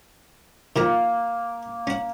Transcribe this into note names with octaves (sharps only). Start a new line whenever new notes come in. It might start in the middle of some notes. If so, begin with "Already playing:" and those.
D#3 F3 A#3 A#5
C#4 F#5